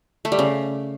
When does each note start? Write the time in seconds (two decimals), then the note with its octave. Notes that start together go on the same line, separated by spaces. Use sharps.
0.25 A3
0.32 G3
0.39 C#3